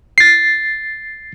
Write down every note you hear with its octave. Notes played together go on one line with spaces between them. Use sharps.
A6 C7